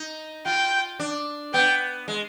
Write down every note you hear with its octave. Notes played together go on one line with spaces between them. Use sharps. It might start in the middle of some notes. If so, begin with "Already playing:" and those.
Already playing: D#4
F4 G5
D4
B3 G5
G#3